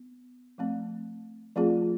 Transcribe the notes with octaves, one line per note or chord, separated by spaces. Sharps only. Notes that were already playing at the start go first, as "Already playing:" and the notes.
Already playing: B3
F3 A3 C4
F3 A3 C4 F4 G#4